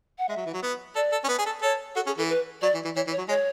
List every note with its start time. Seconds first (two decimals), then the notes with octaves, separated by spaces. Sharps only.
0.18 F#5
0.29 G#3 E5
0.37 F#3
0.46 E3
0.54 F#3
0.63 B3
0.96 A4 D5
1.12 A4
1.24 C#4
1.28 B3
1.39 G#4
1.46 A4
1.62 A4 C#5
1.95 F#4 A4
2.06 C#4 G#4
2.18 E3 A4
2.29 B4
2.62 F#3 D5
2.74 E3
2.85 E3
2.96 E3 C#5
3.07 E3
3.12 C#5
3.18 F#3
3.29 G#3 C#5